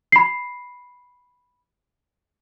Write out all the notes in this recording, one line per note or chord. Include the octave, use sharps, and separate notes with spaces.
B5 C7